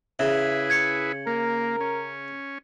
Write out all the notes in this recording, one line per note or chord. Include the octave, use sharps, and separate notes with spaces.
C#3 E4 G#4 B4 E5
G#6 C#7
A#3 A#4
C#4